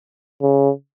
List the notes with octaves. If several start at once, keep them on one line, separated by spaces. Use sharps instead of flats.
C#3